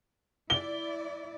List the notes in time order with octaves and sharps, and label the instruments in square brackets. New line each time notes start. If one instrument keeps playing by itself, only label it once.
[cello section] E4 D5 [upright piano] G7